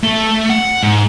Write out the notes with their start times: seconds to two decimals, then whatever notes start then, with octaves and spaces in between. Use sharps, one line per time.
0.03 A3
0.50 F#5
0.83 G#2